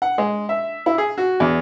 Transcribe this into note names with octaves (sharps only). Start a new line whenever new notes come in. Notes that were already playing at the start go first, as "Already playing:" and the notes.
F#5
G#3
E5
E4
G#4
F#4
E2